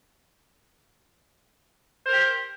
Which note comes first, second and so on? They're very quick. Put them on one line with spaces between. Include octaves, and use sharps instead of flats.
C5 A#4 G4